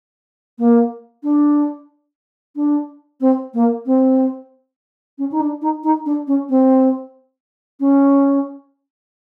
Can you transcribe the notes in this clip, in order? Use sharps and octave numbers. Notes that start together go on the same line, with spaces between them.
A#3
D4
D4
C4
A#3
C4
C#4
D#4
D4
D#4
D#4
D4
C#4
C4
C#4